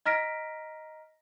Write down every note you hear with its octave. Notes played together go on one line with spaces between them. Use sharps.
D#5 A#5 F6 A#6 B6 D7